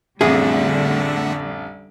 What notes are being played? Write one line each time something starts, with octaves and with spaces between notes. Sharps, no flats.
A1 F2 D3 G3 A3 G#4 E5 F#5